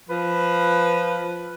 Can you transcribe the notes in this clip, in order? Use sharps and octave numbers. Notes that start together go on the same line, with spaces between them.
F3 B4